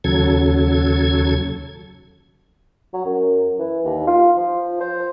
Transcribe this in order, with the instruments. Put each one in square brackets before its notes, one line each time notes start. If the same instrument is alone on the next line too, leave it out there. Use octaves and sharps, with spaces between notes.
[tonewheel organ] D#2 C#3 F#3 A4 G#6
[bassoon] F#3
F#2
E3
D#2
F4
F3
C5